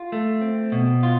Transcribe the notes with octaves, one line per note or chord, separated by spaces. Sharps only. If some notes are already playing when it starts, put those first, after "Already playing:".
Already playing: F4
A3
C4
B2
F4